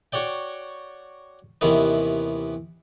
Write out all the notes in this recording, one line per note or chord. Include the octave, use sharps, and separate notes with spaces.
F#4 C#5 D5 G5
D#2 C3 D#3 E3 B3